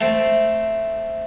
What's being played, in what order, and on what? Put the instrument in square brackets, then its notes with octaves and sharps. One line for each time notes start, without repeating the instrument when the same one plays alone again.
[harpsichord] A3 C4